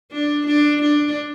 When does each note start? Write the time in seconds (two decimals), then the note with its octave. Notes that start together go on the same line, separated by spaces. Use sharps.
0.12 D4
0.47 D4
0.83 D4